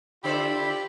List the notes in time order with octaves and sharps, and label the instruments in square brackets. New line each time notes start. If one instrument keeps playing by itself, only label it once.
[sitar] D3 A4 C5 [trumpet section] E4 F4 D5 [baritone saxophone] G4 [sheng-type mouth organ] B5